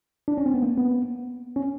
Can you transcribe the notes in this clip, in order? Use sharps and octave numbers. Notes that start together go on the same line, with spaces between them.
D4
C#4
C4
B3
A#3
B3
C#4